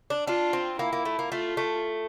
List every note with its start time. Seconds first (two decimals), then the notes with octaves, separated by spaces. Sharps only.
0.10 D4
0.27 D4 F4
0.53 C4
0.79 A#3 E4
0.93 A#3
1.05 A3
1.19 A#3
1.32 A3 F4
1.57 A3